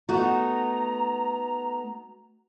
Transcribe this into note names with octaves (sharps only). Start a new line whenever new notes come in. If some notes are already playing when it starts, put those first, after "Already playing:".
A3 B3 D#4 F#4 A#5